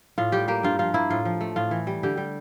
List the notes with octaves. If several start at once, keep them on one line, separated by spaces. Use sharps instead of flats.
A2 F4
G3 G4
A#3 G4
G2 F4
F3 F4
A#3 E4
A2 F4
F3
A3
A2 F4
E3
G3
D3 G4
G3